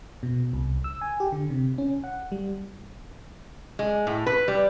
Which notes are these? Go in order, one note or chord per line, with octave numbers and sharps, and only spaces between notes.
B2
C2
E6
G#5
G4
D3
C3
C#4
F#5
G3
G#3
A2
B4
G3